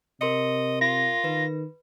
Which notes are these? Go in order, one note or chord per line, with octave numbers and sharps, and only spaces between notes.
C3 A#4 D#5 C6 C#7
F4 A#6
D#3 B4